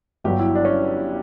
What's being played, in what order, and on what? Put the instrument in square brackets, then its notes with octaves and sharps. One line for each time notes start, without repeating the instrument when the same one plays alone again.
[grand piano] G1 G2 F#3 G4
E4
D4
C#4